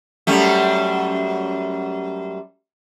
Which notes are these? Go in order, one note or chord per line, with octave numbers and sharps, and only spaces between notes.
F#2 G3 A3